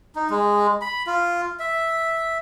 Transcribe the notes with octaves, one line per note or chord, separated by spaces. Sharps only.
D#4
G#3
B5
F4
E5